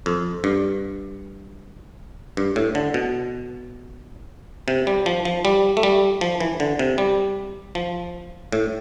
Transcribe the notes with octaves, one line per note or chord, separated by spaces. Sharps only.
F2
G2
G2
A2
D3
B2
C3
G3
F3
F3
G3
A3
G3
F3
E3
D3
C3
G3
F3
A2